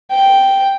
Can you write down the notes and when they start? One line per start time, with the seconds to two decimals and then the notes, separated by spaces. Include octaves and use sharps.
0.11 G5